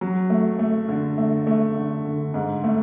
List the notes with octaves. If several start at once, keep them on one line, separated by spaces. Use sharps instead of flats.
F#3
A3
A3
D3
A3
A3
D3
D3
G#2
A3